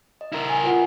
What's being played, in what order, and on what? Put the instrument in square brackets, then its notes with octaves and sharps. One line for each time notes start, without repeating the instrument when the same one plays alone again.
[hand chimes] D#5
[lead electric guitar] E4 A#4
[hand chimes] G#5
F4 B4 F#5